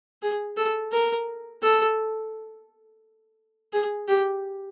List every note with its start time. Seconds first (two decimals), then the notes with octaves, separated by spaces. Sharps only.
0.22 G#4
0.57 A4
0.92 A#4
1.62 A4
3.73 G#4
4.08 G4